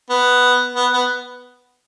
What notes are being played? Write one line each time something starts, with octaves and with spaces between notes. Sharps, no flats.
B3
B3
B3